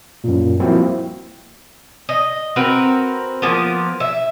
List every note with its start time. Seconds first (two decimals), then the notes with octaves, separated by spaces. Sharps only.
0.24 F#2 A#2
0.59 F3 G3 A#3 C4 E4 F#4
2.09 D#5
2.56 C4 F#4 A#4 B4
3.42 F3 A#3 B3
4.00 E5